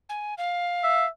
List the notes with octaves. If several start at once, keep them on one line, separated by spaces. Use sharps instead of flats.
G#5
F5
E5